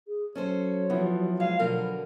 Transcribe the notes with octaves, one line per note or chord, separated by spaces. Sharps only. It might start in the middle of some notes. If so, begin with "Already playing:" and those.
G#4
F#3 C#4 A4 C5 C#5
E3 F3 B3
G#3 F5
B2 D3 A#4 F5